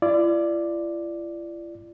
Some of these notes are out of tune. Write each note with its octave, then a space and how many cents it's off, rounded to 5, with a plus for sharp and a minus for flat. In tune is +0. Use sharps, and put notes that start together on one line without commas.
E4 +45 D5 +5